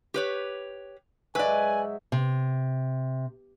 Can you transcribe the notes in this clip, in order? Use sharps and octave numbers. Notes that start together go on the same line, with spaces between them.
G4 B4 C#5
G#2 F#3 B4 D5 E5 G#5
C3